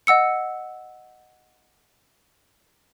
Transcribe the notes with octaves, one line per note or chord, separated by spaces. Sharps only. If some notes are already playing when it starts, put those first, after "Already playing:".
D#5 F#5 E6 C#7